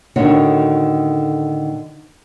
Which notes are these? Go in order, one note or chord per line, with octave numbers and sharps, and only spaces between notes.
A2 D3 D#3 C#4 D#4 F#4